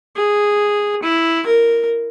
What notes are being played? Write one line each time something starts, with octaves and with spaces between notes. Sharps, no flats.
G#4
E4
A#4